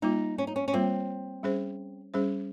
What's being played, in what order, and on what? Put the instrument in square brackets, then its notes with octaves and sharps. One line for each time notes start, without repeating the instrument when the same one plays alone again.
[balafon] G3 A#3 F4 [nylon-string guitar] D#4
[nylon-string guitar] C#4
D#4
C#4
C#4
[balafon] G3 A#3 F4 [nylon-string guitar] C4
[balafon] G3 C#4 G#4 C5
G3 C#4 G#4 C5